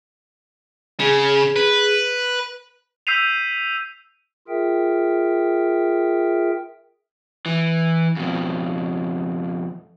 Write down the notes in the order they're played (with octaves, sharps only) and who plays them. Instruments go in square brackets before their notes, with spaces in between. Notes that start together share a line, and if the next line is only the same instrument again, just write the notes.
[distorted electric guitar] C#3 [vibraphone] G#4
[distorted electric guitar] B4
[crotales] E6 G6 B6 C7 D#7 F7
[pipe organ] F4 G#4 A#4 E5 G5
[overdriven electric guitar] E3
F2 B2